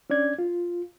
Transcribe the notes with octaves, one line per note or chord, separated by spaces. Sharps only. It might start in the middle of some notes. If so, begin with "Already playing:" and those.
C#4 D4 D5 G#6
F4